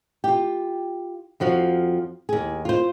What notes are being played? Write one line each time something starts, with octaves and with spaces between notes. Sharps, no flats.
F4 G4
F2 F3 F#4 F5
D#2 G#4
F4 C5